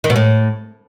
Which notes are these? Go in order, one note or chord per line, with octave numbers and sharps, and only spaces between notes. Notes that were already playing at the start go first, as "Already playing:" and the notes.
D#3
B2
A2